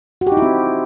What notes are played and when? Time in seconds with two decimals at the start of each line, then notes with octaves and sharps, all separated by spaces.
0.21 F#4
0.27 G4
0.32 D#4
0.37 E4
0.42 C4